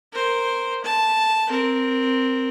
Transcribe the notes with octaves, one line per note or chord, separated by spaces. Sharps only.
A#4 C5
A5
C4 A#4